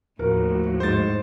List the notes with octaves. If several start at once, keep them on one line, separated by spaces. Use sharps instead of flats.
D#2 A2 F3 F#4 A#4
G#2 C5 A6